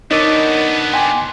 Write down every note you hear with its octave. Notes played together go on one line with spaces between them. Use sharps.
B3 D4 D#4 A#4 C#5 D#5 D6
G5 G#5 C6 D6